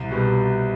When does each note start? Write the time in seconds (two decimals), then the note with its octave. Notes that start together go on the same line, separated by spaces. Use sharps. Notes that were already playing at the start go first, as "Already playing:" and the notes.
Already playing: C2
0.11 B2 G3